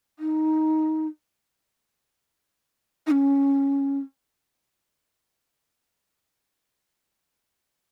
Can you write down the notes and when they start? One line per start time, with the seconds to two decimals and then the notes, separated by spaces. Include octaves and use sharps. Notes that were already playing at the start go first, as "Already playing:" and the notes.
0.19 D#4
3.07 D#4
3.11 C#4